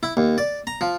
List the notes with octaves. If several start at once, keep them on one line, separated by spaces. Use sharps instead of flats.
E4
D#2
D5
A#5
F3